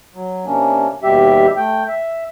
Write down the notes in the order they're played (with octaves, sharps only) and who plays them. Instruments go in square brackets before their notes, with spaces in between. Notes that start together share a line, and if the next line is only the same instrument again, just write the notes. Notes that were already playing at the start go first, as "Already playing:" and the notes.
[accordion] F#3
C3 A#3 C#4 D4
D#2 B2 G3 G4 E5
A3 G5
E5